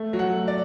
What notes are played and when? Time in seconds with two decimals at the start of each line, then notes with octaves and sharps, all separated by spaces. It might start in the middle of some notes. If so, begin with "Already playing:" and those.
Already playing: A3
0.13 F#3
0.19 F#5
0.34 A3
0.48 D5